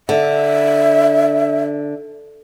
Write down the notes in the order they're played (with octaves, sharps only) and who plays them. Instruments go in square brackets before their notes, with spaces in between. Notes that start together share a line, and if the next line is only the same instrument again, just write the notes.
[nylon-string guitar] D3 [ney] E5